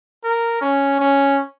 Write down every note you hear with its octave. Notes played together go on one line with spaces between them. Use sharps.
A#4
C#4
C#4